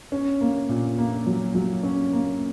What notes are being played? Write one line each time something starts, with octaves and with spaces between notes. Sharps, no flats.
C#4
A#3
A#2
A#3
F#3
F#3
C#4
A#3